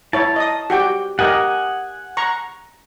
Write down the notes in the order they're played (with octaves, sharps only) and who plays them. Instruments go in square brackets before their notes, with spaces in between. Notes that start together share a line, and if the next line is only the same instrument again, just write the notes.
[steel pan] E4 C#5 [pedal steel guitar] A5
[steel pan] D#5 D#6
F#4 G4 G5
[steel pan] G4 A#4 D#5 [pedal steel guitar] F#5 G#5 D#6
[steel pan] A#5 C#6